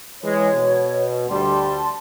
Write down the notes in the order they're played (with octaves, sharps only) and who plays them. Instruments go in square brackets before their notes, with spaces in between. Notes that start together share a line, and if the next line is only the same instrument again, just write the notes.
[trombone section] E3 G#3 [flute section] C#5
[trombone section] B2
[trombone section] D2 G3 [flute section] A5 C6